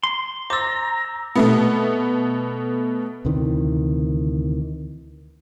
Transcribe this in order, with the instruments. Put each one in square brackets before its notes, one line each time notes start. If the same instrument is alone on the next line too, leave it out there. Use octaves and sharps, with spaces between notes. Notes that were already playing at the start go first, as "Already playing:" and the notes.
[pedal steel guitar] C6
[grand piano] C5 A6 [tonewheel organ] A#5 [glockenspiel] D6 E6
[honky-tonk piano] B2 A3 B3
[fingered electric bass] D2 C3 D#3 E3